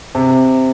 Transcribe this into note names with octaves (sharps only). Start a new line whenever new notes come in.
C3